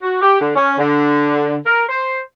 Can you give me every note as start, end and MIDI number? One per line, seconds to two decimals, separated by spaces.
0.02 0.20 66
0.21 0.37 67
0.40 0.52 50
0.55 0.72 61
0.77 1.55 50
1.65 1.83 70
1.88 2.19 72